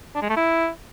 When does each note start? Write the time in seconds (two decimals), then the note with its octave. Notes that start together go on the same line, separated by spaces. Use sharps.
0.15 D4
0.22 G#3
0.29 A3
0.36 E4